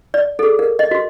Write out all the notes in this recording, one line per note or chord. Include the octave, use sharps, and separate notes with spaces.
D5
G#4 A4
A#4
D#5
F#4 C6